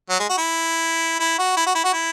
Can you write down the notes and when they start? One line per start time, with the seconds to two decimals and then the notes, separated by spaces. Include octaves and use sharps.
0.10 F#3
0.20 G#3
0.29 F#4
0.38 E4
1.20 E4
1.39 F#4
1.57 E4
1.67 F#4
1.75 E4
1.84 F#4
1.94 E4